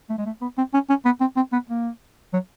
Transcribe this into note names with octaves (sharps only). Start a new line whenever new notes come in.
A3
G#3
A3
B3
C4
C#4
C#4
B3
C4
C4
B3
A#3
F#3